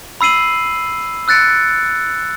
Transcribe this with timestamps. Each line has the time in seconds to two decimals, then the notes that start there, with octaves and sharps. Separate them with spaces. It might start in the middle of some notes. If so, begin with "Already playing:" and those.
0.21 B5 E6 C7 D#7 F#7
1.28 E6 F#6 A6 C#7 D7